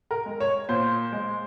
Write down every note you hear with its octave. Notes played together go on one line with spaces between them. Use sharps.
A#4
G#3
C#5
A#2 C5
G#3